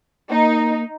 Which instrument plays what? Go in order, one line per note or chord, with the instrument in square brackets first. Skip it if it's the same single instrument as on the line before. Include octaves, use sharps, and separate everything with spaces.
[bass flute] A#3 [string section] D#4